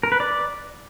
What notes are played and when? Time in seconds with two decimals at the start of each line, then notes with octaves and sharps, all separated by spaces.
0.03 A#4
0.12 B4
0.20 D5